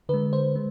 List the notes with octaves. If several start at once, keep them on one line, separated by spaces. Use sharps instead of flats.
D3 G#3 B4
C5
G#3